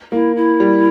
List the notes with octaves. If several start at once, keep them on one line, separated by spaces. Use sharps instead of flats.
A#3 E4
E4
G3